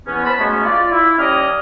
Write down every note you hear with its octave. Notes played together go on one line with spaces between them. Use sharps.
E2 B3 C#4
C5 A5 B5
F#3 G#3 A3 B3 C#4
F4 D5
E4
D#2 G3 C#4 D5 D#5 F6